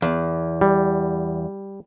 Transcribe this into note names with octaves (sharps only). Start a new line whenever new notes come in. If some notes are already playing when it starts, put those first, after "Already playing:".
E2
G3